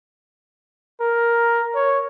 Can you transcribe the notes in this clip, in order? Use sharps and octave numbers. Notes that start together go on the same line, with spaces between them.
A#4
C#5